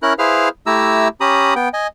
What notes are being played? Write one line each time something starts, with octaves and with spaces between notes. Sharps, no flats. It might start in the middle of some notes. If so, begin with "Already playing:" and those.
C#4 E4 A#4 F#6
E4 G#4 B4 C5 F5 F6
A3 E4 G4 A#5 E6
C#4 G4 A#5 B5 D#6
B3 G5
D#5 G#5